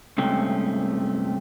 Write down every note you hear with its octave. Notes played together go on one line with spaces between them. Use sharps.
G2 C3 G#3 A3 C4 C#4